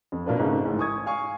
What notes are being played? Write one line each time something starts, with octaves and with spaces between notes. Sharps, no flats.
F2
B2 A#3 B3 D4 F4 B4
G#2 C#3 G#3 A3
A1 G#2
G#5 C#6 D#6 G#6
F5 G#5 C#6